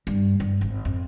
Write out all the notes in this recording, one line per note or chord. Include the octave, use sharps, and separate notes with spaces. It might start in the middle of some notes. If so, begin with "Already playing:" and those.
G2
G2
G#1
F2